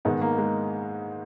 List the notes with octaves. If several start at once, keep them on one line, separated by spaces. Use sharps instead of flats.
G#2 D#3 G#3 B3 D#4
A#3
G#3